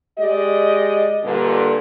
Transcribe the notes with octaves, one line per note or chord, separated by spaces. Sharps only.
G#3 G4 D5 D#5
G2 A#2 D3